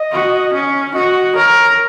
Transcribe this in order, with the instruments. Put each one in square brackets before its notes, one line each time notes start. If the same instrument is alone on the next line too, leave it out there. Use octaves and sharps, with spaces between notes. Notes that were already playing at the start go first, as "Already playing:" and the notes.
Already playing: [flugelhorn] D#5
[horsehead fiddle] F#4
C#4
[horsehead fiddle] F#4 [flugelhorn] D#5
[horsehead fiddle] A#4 [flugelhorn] C#5